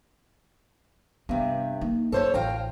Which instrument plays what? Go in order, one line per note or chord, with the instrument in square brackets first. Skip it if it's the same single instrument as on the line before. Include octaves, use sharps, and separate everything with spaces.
[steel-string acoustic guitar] G2 C3 [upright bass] B3
[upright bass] A#3 D#4
[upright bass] F#2 [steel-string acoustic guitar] A4 C5 C#5
[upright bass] A1 [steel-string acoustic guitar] F4 G5 A#5